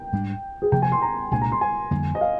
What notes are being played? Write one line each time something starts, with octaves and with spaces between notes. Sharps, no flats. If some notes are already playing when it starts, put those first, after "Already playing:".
Already playing: G5
G#2 G3 D4
G#4
D2 C3 F3 A#3 G5
G#5
C6
A#5
C2 A#2 G#3 D4 G#5
A#5
C6
G#5
F2 D3 G3 A#3
D#5
F5